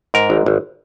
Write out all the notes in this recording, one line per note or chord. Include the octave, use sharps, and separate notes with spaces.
G#2 A#4
G#1
G#1